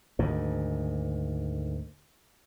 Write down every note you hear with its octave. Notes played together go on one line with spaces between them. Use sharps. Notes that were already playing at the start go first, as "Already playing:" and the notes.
D2 G#2 D#3